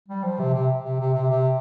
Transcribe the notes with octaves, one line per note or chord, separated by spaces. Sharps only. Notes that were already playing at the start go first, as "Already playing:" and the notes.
G3
F3
C3
C3
C3
C3
C3
C3